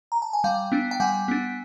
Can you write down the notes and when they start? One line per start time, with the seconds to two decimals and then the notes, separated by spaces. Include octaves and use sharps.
0.12 A#5
0.22 A5
0.33 G#5
0.44 G3 F5 G5
0.72 B3 D4
0.91 G5
1.00 G3 F#5 G#5
1.28 B3 D4